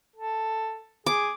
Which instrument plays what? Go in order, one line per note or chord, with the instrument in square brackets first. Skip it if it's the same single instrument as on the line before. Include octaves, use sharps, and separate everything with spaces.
[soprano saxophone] A4
[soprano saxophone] G#4 [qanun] D6